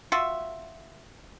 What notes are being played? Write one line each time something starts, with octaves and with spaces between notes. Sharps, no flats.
F4 F#4 E5